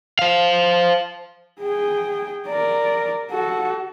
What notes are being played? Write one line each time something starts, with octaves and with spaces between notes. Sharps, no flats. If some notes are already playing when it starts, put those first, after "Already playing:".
C5 F5
G#4 G5
A#4 D5
F#4 A4